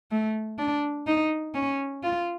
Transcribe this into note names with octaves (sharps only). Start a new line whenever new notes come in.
A3
D4
D#4
C#4
F4